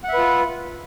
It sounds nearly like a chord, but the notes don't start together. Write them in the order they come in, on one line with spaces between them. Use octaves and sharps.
F#5 E5 B4 F4